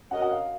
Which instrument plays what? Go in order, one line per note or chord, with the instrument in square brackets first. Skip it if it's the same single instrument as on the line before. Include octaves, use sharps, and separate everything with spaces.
[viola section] C#4 F#4 A#4 D#5 [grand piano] F#5
[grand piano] F#5
F5